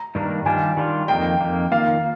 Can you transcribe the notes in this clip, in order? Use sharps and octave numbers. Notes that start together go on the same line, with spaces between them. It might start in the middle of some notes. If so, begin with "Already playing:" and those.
Already playing: A#5
G2 D#3 G3 A#3 D4
D#3 G3 D4 F4 G#5
D#3 G3 D4 F4
F2 D#3 A#3 G5
F2 D#3 A#3
D#3 A#3 F4 F5